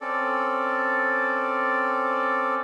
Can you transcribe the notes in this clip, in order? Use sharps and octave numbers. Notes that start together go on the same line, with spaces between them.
C4 C#4 A4 D5